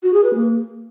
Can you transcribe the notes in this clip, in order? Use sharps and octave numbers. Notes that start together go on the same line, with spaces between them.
F#4
G#4
B4
A#3